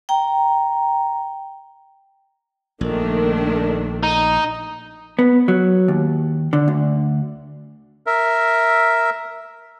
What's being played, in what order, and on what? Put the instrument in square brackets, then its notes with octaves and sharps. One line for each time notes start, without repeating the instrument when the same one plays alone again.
[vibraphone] G5 A#5
[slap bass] A#1 [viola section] D#3 A3 D4
[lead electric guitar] D#4
[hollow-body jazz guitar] B3
F#3
D#2
D3
D2
[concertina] A#4 E5